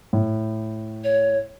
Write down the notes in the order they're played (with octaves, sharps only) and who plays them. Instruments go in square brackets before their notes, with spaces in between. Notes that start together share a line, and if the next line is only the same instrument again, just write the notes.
[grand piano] A2
[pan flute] C#5